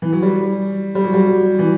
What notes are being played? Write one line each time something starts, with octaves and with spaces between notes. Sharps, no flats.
E3
F#3
G3
G3
F#3
G3
E3